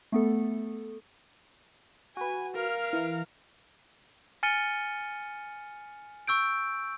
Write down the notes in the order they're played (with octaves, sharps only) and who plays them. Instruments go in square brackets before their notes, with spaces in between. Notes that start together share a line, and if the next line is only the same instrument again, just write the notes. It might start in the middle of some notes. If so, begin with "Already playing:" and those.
[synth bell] A3 B3 A4
[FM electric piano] F#4 B4 [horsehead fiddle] G#5
[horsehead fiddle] A#4 F5
[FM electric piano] E3 E4
[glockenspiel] G#5 F6 A6 C#7 D#7 G7
C#6 E6 G6 D7